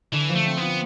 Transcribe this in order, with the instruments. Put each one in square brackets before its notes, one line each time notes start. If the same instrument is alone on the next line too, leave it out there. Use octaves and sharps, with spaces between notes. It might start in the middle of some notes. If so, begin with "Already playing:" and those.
[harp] D3 [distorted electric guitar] E3
[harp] F3
[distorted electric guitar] A3
[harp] C4
[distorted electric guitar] B3 [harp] F4